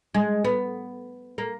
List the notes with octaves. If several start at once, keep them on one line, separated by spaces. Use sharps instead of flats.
G#3
B3
A#3